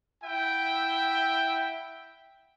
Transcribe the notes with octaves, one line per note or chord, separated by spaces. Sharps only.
E4 E5 F#5 G5